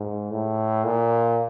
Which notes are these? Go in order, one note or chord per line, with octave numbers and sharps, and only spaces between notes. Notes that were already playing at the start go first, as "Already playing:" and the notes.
Already playing: G#2
A2
A#2